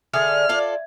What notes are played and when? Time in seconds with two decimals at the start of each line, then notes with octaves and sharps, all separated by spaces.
0.14 D3 G#4 D5 E5 F6 G#6
0.49 F4 A4 D5